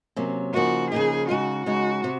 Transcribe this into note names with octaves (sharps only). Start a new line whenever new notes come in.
C3 F#3 A#3 C#4
C#3 F3 A#3 D#4 F#4
C#3 F3 A#3 D#4 G#4
C#3 G#3 D#4 F#4
C#3 G#3 D#4 F#4
C3